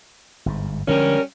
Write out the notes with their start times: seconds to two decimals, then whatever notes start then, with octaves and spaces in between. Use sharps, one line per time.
0.46 G1 G#2
0.88 D3 F3 G3 G#3 C#4 A#4